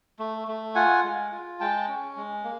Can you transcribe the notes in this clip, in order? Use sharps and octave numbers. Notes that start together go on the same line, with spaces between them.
A3
A3
F4 F#5 G#5
G#3
F4
G#3 G5 A5
C#4
G#3
A#3